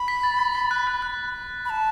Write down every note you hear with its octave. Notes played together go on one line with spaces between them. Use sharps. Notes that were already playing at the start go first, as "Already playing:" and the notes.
Already playing: B5
B6
A6
A6
B6
F#6
F#6
F#6
B5
A5